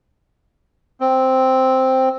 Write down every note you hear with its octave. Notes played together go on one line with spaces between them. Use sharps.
C4